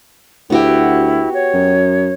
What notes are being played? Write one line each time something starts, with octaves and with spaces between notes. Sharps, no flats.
D2 B3 E4 F#4 G4
C#5
F#2